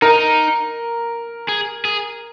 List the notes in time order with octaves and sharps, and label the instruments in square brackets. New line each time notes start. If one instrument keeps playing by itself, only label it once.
[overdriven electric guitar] D#4 [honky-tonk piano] A#4
[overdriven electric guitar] G#4
G#4